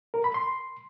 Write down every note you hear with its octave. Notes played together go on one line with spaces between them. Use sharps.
A#4
B5
C6